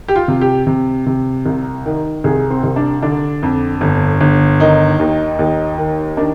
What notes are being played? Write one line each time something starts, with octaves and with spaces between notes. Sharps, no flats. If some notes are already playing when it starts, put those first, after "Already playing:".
G4
F4
C3
G4
C3
C3
C2
D#3
C2 G#4
C4
C2
D4
D3 D4
F2
G1
G1
D#3 D#4
D#2
D#2
D#3
D#3 D4